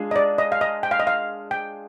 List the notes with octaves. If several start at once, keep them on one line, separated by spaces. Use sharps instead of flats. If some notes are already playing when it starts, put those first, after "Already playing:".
Already playing: G#3 D4 F4 G#4
D#5
D5
D#5
F5
D#5
G5
F5
D#5
F5
G5